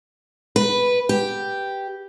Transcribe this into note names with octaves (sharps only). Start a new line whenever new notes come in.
B4
G4